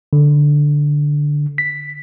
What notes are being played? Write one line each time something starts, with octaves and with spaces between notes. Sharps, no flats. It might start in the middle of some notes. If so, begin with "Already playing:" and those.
D3
B6